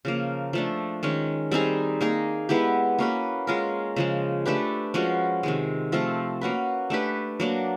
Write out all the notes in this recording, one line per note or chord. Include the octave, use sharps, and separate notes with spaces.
C#3 F3 A#3
F3 A3 D4
D#3 G#3 C#4
G3 C4 D#4 G#4
A#3 D#4 G#4
G#3 B3 E4 G4
A#3 C#4 F#4 B4
G#3 C#4 F4 A#4
C#3 F3 G#3
A3 D4 G4 B4
F3 G#3 C#4 F#4
C3 D#3 G#3
F3 A3 C4 F4
A#3 C#4 F#4 B4
A3 D4 G4 B4
F#3 A#3 D4